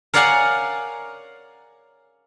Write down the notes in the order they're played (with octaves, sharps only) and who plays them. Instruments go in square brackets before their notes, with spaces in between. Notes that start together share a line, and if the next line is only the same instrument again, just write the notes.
[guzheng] A#4 C#5 D5 F5 F#5 G#5